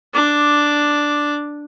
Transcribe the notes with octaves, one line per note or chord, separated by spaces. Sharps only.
D4 D6